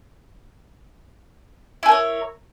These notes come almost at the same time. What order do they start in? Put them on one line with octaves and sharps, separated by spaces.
E4 G#4 A#4 C#5